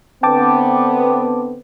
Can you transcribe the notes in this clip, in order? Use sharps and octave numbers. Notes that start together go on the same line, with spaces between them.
D3 B3 C4 G5 A5 D6